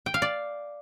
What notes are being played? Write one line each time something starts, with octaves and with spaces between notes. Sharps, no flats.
G5
F5
D5